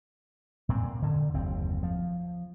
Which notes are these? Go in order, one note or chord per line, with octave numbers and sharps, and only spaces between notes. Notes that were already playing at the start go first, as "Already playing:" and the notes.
A#2 C4
D3
F#1 D#2 C4
F3